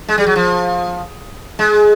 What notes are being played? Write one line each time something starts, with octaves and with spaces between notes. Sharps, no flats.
G#3
G3
F#3
F3
G#3